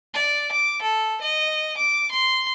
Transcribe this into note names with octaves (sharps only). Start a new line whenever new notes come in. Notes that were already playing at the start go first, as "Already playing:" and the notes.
D5
D6
A4
D#5
D6
C6